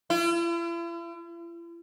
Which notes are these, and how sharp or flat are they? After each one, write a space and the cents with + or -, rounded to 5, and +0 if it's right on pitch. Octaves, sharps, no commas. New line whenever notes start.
E4 +45